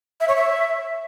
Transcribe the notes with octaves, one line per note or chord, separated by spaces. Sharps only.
E5
C#5
E5